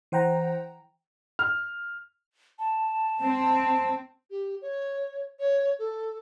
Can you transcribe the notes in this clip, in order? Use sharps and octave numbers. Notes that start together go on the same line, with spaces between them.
E3 C5 F#5 G5 A#5
F6
A5
C4
G4
C#5
C#5
A4